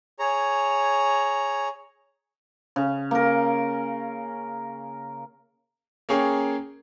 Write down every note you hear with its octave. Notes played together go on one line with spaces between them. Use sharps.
G#4 C#5 A#5
C#3
A#3 A#4
A#3 C#4 G#4 C#5 G5